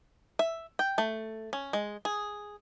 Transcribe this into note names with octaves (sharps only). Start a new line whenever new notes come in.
E5
G5
A3
C#4
G#3
G#4